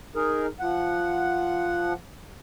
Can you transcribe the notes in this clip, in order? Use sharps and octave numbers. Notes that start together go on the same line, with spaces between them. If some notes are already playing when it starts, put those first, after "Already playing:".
D#4 G#4 A#4
F3 F#5